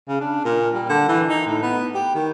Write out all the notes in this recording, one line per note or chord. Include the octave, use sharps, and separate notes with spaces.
C#3
D4
A#2
G3
D3
E3
D#4
A2
B3
G4
D#3